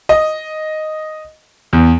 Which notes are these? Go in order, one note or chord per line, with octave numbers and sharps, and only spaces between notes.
D#5
E2